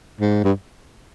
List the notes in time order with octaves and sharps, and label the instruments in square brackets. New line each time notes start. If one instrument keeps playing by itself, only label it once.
[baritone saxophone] G#2
G2